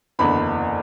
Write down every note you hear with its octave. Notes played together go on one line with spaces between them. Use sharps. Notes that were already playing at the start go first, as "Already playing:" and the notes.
F#1 E2 D3 B5